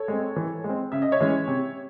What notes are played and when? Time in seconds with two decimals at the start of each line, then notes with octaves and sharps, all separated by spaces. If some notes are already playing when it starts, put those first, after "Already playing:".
Already playing: A4 C#5
0.08 G#3 C4
0.36 E3
0.64 G#3 C4
0.92 C#3 E5
1.02 D#5
1.12 C#5 E5
1.21 E3 G#3 C#4
1.48 C3